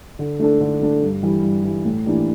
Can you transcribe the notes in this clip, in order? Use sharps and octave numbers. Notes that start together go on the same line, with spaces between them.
D3
A3 D4 A4
D3
A3 D4 A4
G2
E3 G3
G2
E3 G3
A2
E3 A#3 D4 G4